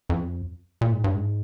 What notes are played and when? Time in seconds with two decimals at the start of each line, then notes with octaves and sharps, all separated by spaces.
0.09 F2
0.81 A#2
0.93 G#2
1.04 G2
1.15 G#2